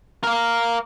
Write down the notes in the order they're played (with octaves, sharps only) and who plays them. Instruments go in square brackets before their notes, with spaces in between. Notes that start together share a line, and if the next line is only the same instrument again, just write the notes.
[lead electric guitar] A#4 F5